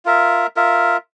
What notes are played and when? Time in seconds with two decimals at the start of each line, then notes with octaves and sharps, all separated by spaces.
0.05 F4 A#4 E5
0.56 F4 A#4 E5